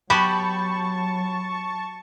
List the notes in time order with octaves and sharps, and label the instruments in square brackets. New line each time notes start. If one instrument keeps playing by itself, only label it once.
[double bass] F#3 [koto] B3 F#4 G4 [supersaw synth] A5 C#6 [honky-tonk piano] B5